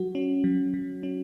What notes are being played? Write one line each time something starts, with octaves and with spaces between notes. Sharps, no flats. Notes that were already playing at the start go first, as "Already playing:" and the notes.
Already playing: F#3 F#4
C#4
F#3
F#3
C#4